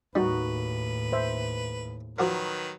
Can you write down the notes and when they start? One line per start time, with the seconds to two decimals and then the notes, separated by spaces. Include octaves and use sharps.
0.15 D#2 A2 G3 D#4 F#4 B4
1.12 C5 E5
2.19 D#3 F3 F#3 F#4 A#4 B4